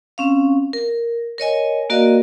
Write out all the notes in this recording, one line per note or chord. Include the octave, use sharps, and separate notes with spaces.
C4 C#4 F5
A#4
A#4 C#5 D#5 G#5
A#3 F#4 A#4 D5 D#5 F5